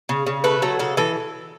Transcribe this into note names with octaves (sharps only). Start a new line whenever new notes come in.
C#3
C#3
A3 B4
F#3 A4
C#3 A4
E3 A4